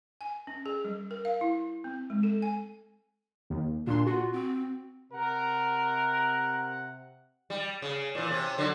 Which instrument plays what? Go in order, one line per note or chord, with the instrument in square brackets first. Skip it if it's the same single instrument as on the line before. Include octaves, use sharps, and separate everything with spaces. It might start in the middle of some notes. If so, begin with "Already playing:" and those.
[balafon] G#5
C#4
G#4
G3
A#4
F5
E4
C4
G#3
A4
G#5
[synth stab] D#2
[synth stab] A#2 C6 [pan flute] D4
[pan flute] F4 [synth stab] F#4
[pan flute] C4
[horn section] C3 F#5 [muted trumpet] A#4
[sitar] G3
C#3
A#2 E3
C3 C#4
D3 F#3